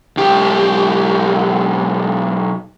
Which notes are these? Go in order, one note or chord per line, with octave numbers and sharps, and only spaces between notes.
B1 G4